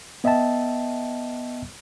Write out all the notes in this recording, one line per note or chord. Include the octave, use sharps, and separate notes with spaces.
B3 D#5 E5 G5 A5